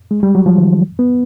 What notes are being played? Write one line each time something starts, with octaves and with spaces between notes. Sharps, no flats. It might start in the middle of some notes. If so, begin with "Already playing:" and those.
G#3
G3
F#3
F3
D#3
B3